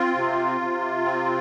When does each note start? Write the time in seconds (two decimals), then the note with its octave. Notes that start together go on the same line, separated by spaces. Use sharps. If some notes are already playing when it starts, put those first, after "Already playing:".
Already playing: C4 F4
0.16 C3
0.60 C3
1.05 C4